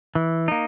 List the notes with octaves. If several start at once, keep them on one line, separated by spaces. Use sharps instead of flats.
E3
A#3 D#4